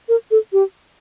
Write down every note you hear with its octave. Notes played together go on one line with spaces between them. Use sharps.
A#4
A4
G4